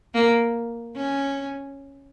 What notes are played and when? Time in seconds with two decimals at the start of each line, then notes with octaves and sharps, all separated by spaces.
0.14 A#3
0.96 C#4